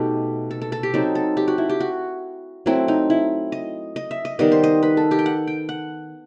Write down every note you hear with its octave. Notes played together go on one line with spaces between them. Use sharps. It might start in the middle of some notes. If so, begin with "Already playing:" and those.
Already playing: B2 A3 D#4 G4 A4
A4
A4
A4
G4
F#3 C4 D#4 A4
A4
G4
F#4
E4
G4
F#4
F#3 A3 C4 E4
D#4
E4
D#5
D#5
E5
D#5
D#3 G3 B3 D#5
C5
D#5
B4
A4
G4
G5
F#5
G5
F#5